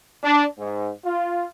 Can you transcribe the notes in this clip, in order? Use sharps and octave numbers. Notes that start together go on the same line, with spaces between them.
D4
G#2
F4